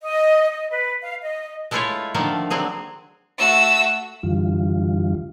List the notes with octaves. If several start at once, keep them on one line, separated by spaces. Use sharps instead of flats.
D#5
D#5
B4
F5
D#5
G#3 A3 E4 F4 G#4 C#5
D3 D#3 F3 A3 A#3
D3 F#3 C4 G#4
A3 F#4 E6
F#2 D3 E3 G3 F4